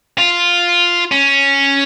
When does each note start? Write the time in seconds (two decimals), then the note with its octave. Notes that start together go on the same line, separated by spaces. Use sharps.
0.18 F4
1.12 C#4